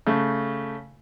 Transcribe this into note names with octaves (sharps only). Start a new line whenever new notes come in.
C#3 A3